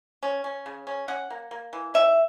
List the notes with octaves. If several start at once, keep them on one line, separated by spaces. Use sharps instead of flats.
C#4
C#4
C#3
C#4
C#4 F#5
A#3
A#3
E3
C#4 E5